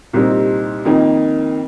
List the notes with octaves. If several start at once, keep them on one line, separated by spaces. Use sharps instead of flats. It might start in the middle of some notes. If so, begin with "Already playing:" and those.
C2 A#2 G3 C4 D#4
F2 D#3 A#3 D#4